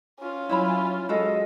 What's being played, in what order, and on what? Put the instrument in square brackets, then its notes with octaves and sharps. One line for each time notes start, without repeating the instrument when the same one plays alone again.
[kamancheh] C#4 F4
[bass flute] F#3 [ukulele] E4 C#5 B5
[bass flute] G#3 [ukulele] F#4 A4 F5 [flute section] D#5